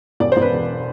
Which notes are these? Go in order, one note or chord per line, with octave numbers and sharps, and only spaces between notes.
E1 D5
E1 C5
B4
E2